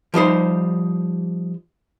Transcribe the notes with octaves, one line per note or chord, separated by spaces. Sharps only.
F3 G3 D#4 C5